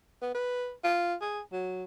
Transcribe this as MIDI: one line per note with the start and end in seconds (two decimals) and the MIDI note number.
0.21 0.34 59
0.35 0.72 71
0.84 1.14 65
1.21 1.40 68
1.52 1.84 54